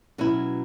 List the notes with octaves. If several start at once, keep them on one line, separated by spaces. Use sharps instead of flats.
B2 F#3 C#4 E4